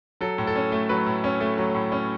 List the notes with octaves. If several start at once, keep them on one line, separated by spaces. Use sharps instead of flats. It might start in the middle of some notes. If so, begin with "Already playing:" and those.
F#3 A4
A2
A4
C#4
A3
F#3 B4
A2
C#4
A3
F#3
A2
C#4